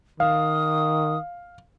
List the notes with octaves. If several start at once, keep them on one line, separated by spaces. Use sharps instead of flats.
D#3 F5 D#6